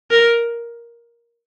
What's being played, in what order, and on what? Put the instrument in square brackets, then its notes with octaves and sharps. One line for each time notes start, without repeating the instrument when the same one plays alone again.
[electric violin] A#4